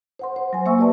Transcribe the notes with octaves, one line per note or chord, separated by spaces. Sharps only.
C5 F#5 C6
C5
F#3 G#5
A#3 C5 E5 G#5 C#6 E6
G4 B4 D5 A5